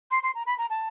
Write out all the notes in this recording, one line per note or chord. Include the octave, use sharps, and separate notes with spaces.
C6
C6
A#5
B5
A#5
A5